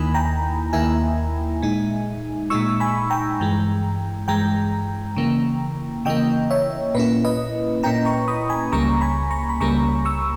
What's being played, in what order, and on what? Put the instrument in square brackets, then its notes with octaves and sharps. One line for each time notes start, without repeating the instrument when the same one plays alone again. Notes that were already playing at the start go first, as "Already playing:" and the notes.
Already playing: [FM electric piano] D#2 D#3 A#3 E4 G#5 B5
G5 A#5
D#2 D#3 A#3 E4 E5 G#5
A#2 G#3 D#4
A#2 G#3 D#4 C#6 E6
G#5 B5
G5 A#5
G2 E3 G#3
G2 E3 G#3 G5 A#5
C#3 E3 A#3
C#3 E3 A#3 D#5 G5
C#5 E5
A#2 A#3 C#4 E4 B4
B4 D#5
A#2 A#3 C#4 E4 G5 A#5
A#5 C#6
B5 D#6
G#5 B5
C#2 C#3 G3 A#3 A#5 C#6
G#5 B5
A#5 C#6
B5
C#2 C#3 G3 A#3 A#5 C#6
C#6 E6